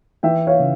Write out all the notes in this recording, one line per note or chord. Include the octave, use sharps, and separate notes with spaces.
E3 E5 G5
C#5 F5
C#3